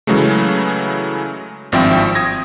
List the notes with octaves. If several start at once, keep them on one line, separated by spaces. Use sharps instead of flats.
C#3 E3 F#3 G#3 A3
G#1 G2 F3 C4 E5 G5
D#6 G#6 A#6